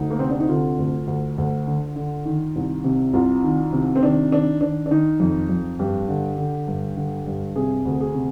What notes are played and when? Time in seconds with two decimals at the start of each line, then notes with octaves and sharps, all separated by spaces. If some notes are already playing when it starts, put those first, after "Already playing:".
Already playing: D2 D#4
0.10 A#3
0.19 C3 C4
0.30 D4
0.40 D#4
0.48 D3 F4
0.78 D2
1.07 D2
1.38 D2
1.67 D3
1.96 D3
2.25 D#3
2.56 C2
2.84 C3
3.13 C2 F4
3.44 D#3
3.73 C3
3.96 C4
4.02 D#3 D4
4.31 D#3 D4
4.61 D#3 D4
4.86 D4
4.91 D#3 D#4
5.20 F2
5.49 F2
5.79 G2 G4
6.08 D3
6.38 D3
6.68 G2
6.97 D3
7.27 G2
7.56 C3 G#4
7.85 D2
8.00 G#4
8.15 C3